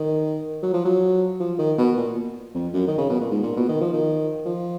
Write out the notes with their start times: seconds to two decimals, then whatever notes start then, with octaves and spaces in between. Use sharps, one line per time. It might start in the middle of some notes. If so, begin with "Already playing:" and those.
Already playing: D#3
0.63 F#3
0.74 F3
0.85 F#3
1.40 F3
1.59 D#3
1.78 B2
1.97 A#2
2.54 F2
2.74 F#2
2.88 D#3
2.98 C#3
3.09 B2
3.20 A#2
3.31 G#2
3.43 A#2
3.57 B2
3.69 D#3
3.81 F3
3.93 D#3
4.46 F3